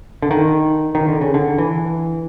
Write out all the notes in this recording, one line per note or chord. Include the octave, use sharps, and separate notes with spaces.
D3
D#3
D#3
D3
C#3
D3
E3